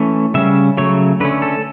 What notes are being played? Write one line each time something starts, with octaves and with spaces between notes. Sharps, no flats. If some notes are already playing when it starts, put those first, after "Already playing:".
Already playing: E3 A3 C#4
C#3 G3 C#4 E5
C#3 F#3 A3 C#5
D3 A3 C#4 B4
A4